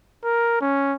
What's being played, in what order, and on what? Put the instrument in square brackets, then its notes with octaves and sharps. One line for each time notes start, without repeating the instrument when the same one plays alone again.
[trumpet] A#4
C#4